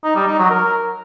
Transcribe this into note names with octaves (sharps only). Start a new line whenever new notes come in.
D#4
G3
D#4
F#3
A#4